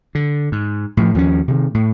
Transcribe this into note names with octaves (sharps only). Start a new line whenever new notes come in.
D3
G#2
A2 F3
D#2 F3 A#3 C#4
C3 D#3
A2